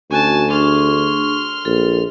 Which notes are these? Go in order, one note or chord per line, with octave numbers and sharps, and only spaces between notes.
D2 C#4 F#4 G#5 A5
D4 G#4 C6 C#6 F6
A#1 A4